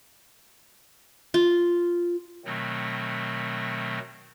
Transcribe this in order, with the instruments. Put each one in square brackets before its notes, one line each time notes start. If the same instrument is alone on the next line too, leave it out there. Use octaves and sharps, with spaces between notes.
[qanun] F4
[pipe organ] B2 D#3 F#3 A3 C4